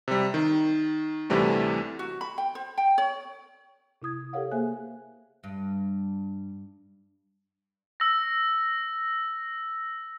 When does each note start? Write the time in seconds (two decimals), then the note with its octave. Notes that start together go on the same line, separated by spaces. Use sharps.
0.08 C3 G3
0.34 D#3
1.30 D2 C3 E3 G3 A3
1.99 F#4
2.21 B5
2.38 G5
2.55 C5
2.78 G5
2.98 C#5
4.02 C3 E4 D#6 G#6
4.33 G4 A4 A#4 C#5 F5 F#5
4.51 A#3 G#4 C5 E5 G#5 F#6
5.44 G2
8.00 E6 A#6